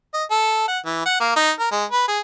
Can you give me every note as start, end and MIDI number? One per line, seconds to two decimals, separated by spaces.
0.14 0.24 75
0.31 0.65 69
0.68 0.79 78
0.85 1.03 52
1.05 1.16 78
1.20 1.34 58
1.36 1.51 63
1.59 1.68 70
1.72 1.85 56
1.91 2.07 71
2.08 2.20 68